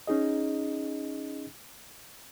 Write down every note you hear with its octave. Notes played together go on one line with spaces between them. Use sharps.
C#4 D#4 G#4 D#5